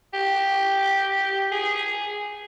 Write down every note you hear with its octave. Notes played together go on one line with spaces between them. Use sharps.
G4
G#4